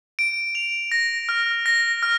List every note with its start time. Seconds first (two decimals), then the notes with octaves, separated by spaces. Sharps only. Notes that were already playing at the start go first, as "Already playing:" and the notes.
0.19 D7
0.55 F7
0.92 A#6
1.29 F6
1.66 A#6
2.03 F6